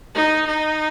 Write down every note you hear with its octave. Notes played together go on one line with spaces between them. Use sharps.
D#4
D#4